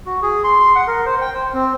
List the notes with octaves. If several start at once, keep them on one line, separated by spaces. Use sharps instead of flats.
F#4
G#4
C6
C6
F#5
A#4
C5
G5
C5
C4